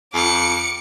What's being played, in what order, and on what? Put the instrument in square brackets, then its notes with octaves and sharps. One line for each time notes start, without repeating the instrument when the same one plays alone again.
[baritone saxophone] F2 [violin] D6 C#7